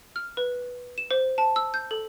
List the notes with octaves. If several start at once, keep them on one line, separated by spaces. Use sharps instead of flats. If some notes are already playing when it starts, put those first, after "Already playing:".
F6
B4
E7
C5
A5
E6
G6
A4